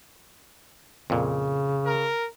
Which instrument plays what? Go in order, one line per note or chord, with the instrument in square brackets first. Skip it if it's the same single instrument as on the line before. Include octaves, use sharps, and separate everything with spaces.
[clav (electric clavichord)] F2 A#2 [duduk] C#3
[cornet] A#4